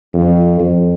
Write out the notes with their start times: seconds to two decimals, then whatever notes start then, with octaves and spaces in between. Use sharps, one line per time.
0.14 F2
0.59 F2